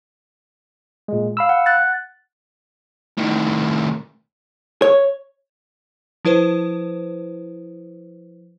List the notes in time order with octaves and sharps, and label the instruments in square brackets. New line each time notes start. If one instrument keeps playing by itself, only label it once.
[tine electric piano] A#2 G#3
F5 B5 E6
[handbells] F#5
F#6 A6
[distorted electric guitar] A2 D#3
[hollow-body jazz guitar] C#5
[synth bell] F3 E4 B4 C5